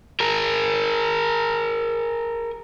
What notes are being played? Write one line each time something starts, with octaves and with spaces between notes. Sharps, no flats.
G#4 A#4